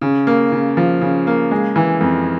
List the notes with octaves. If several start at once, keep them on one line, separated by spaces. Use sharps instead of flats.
C#3
A#3
C#3
F3
C#3
A#3
G#3
E3
F2